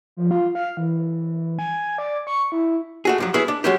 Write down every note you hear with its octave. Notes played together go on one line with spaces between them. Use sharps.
F3
F4
F5
E3
G#5
D5
C#6
E4
A3 F#4 G#4
G2 F3 F#3
B3 C#4 E4 F#4 G#4 B4
D4
F#3 G#3 C#4 F#4 G4